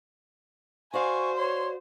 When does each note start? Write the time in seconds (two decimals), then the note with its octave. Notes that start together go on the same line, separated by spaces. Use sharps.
0.94 F#4 C5 D5 F5 G#5 C#6
1.37 C#5 C6